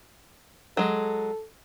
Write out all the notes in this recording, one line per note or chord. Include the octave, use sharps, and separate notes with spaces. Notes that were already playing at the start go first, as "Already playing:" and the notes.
F#3 G#3 A4